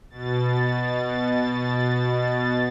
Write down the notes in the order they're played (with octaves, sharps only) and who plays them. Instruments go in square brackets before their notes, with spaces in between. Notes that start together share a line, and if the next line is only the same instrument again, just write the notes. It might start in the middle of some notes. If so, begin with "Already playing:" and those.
[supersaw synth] B2 A6